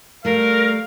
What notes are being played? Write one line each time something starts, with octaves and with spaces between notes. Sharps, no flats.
G3 A3 A#4 F5